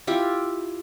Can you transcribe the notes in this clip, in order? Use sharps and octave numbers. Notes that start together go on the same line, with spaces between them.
E4 F4 G4